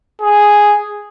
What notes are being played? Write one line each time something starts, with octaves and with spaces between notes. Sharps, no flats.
G#4